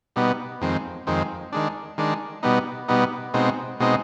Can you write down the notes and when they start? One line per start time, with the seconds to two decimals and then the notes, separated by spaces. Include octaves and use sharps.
0.16 B2 G3 B3 D#4
0.61 F2 D#3 G#3 C4
1.07 F2 D#3 G#3 C4
1.52 D#3 G#3 D4
1.98 D#3 G#3 D4
2.43 B2 G3 B3 D#4
2.88 B2 G3 B3 D#4
3.34 B2 G#3 C4 D#4
3.80 B2 G#3 C4 D#4